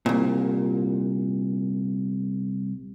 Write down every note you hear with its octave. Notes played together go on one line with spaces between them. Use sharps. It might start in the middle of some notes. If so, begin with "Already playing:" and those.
C2 A#2